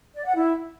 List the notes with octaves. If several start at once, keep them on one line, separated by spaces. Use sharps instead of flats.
D5
F#5
E4